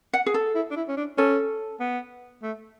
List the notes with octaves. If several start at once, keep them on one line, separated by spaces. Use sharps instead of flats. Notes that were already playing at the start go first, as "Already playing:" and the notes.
F#5
G#4
A4
E4
D4
E4
C#4
D4
C#4 A4
B3
A3